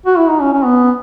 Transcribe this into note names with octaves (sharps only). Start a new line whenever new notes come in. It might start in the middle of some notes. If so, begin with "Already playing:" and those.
F#4
E4
D#4
C#4
C#4
B3